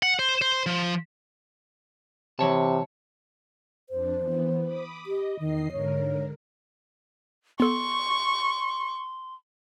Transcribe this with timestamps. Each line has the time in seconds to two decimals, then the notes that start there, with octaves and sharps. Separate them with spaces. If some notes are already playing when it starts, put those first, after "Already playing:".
0.03 F#5
0.19 C5
0.41 C5
0.66 F3
2.39 C3 E3 C#5 A5
3.90 F2 D4 C5
4.18 E3 B3
4.64 B5 D6 D#6
5.06 G4 D#5
5.39 E2 D#3 D#5 C7
5.72 G#2 D3 A#4 C#5
7.60 B3 A4 C6 C#6